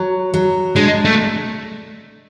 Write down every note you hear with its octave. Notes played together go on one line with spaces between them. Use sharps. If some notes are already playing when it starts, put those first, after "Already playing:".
Already playing: F#3
F#3
G#3 D4
A3